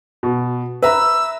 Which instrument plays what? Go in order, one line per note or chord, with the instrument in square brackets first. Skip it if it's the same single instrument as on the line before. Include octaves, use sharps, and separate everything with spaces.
[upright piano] B2
[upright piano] B4 E5 A#5 [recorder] E6